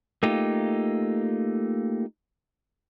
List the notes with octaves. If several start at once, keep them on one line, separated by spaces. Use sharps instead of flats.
A3 A#3 D#4 F4 G4